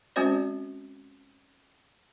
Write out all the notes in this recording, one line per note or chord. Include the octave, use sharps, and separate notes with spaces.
G#3 C4 C#4 F#4 C5 D5